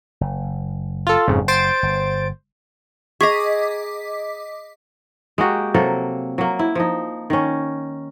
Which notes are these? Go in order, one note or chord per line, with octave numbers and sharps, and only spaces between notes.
F#1
F4 A4
F#1 F2 G#2 C#3
C5 A6 D7
G1
G#4 D#5 A#5 C#6 D6 B6
G#3 A#3 F#4 G4
C3 F#3 A#3 A4
F#3 A#3
E4
F3 D#4
D#3 C#4